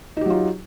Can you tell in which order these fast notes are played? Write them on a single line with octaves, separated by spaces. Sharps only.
D#4 G4 F#3 F4